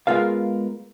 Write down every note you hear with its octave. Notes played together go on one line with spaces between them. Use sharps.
G#3 B3 F4 A#4 F5